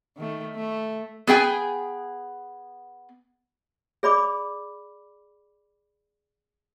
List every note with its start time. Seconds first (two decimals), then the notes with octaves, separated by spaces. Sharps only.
0.17 D#3 A3
0.55 A3
1.27 B3 G#4 G5 G#5
4.03 G#4 D5 B5 D6